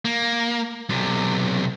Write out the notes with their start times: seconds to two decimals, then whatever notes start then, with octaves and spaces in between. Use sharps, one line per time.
0.05 A#3
0.89 B1 C3